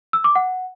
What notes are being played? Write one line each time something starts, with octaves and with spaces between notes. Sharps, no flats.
E6
D6
F#5